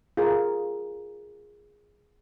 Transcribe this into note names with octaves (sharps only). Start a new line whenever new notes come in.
F4 G#4 A#4